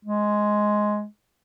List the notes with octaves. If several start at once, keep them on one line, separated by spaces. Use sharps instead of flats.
G#3